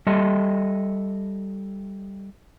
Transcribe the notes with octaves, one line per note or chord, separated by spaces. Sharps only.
G3 A4 D#5 E5